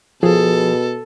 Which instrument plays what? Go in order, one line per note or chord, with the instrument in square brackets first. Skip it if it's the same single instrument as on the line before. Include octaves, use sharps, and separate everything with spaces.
[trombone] B2 [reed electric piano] F3 [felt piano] G#4 [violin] A4